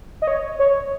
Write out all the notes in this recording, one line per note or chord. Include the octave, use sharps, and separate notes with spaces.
D#5
C#5
C#5